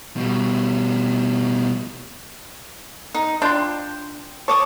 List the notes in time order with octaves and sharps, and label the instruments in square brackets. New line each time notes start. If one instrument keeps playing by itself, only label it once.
[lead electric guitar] B2 G3
[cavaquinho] D#4
[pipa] D4 F4 C6 [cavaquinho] G5
[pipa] C#5 [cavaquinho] A5 D6 D#6